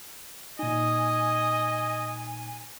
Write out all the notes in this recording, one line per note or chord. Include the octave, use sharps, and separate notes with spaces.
A#2 D#4 D#5 G#5